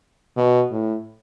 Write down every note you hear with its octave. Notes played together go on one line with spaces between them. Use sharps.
B2
A2